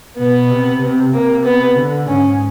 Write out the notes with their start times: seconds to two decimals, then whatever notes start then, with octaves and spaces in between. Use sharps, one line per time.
0.17 B2 B3
0.50 C3
0.81 C3
1.13 C3 A#3
1.45 B3
1.76 D3
2.08 G#2 C#4